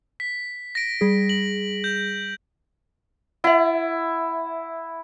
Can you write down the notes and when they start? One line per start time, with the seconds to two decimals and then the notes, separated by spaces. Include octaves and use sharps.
0.20 B6
0.75 A#6 D7
1.01 G3 G#4
1.29 F#7
1.84 G6
3.44 E4 E5 F#5